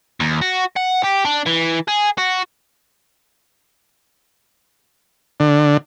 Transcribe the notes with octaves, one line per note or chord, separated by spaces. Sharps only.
D#2
F#4
F#5
G4
D4
E3
G#4
F#4
D3